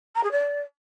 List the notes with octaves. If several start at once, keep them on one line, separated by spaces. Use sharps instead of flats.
A#5
G#4
D5